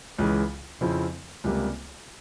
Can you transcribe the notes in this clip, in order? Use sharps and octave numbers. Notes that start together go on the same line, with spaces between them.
C#2 C#3 E3 G#3
F2 C#3 F3 C4 E4
C#2 C3 G3 A#3